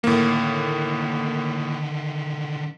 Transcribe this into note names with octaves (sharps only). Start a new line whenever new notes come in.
A2 D3 D#3 A#3